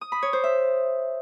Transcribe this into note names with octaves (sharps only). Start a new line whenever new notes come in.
D#6
B5
C#5
C5
E5